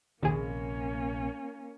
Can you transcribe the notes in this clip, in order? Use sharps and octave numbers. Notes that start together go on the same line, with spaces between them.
A#1 D#2 C3 A#3 C#4 G#4